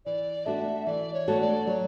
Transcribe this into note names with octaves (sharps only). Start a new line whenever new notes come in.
E3 D5
A3 D4 F#4 A4 E5
E3 D5
C#5
A3 D4 F#4 A4
D5
F#3 C#5